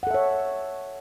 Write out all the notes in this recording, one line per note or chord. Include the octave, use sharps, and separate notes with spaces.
A4 C#5 E5 F#5